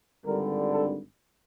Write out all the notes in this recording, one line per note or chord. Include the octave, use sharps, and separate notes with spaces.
G#1 G2 D3 G3 A#4
A4